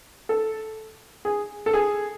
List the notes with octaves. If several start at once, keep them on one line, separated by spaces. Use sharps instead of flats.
A4
G#4
A4
G#4